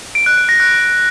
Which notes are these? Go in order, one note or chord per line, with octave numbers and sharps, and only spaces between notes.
D7
F#6
D7
A#6
F#6